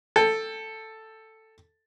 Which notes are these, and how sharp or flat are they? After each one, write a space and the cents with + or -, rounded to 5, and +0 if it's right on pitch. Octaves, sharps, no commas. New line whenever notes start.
A4 +5 G5 +25